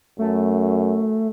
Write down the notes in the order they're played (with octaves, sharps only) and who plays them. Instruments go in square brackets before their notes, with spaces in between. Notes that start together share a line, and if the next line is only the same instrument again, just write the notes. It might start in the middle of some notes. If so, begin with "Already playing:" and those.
[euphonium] F#2 [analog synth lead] A3